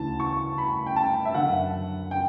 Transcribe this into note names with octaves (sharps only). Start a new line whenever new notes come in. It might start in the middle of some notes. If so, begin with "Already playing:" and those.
Already playing: D2 C#3 E3 A5
C#6
B5
G5
A5
E5
F#2 D3 F#5
G5